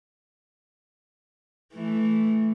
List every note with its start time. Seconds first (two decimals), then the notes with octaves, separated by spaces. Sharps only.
1.74 E3 A3